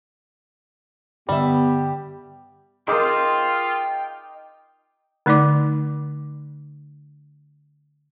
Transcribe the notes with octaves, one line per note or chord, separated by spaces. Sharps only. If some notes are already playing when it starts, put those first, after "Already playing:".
G2 D3 G3 B3 G4 E5
D#4 F4 G#4 A#4 G5 C6 D6
D3 A3 D#4 D5 D6